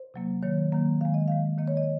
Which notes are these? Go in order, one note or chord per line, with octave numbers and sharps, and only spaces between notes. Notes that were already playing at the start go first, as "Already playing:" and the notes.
Already playing: C5
C3 F#3 A#3
D#3 F#3 A#3 C#5
D#3 F#3 A#3
D#3 G#3 F5
D#5
D#3 G#3 F5
D#3 A#3 D#5
C#5
D#5